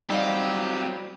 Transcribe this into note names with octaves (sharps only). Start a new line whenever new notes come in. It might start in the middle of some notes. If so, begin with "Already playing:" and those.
F#3 G3 C4 D#4 G4 D#5 F5